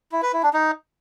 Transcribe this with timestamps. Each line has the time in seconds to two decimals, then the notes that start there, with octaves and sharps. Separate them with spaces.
0.12 E4
0.22 B4
0.33 E4
0.43 D4
0.53 D#4